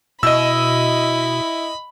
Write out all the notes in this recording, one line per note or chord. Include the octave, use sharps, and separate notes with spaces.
B2 E4 D#5 B5 E6